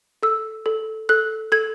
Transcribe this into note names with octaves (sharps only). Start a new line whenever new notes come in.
A4 E6
A4
A4 F#6
A4 G#6